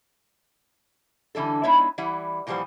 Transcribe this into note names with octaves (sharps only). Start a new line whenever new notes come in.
D3 E3 G3 A4
G#3 B3 D#4 E4 C#5 E5
E3 G3 E4 F#5
A#2 E3 F3 G3 C5 F#5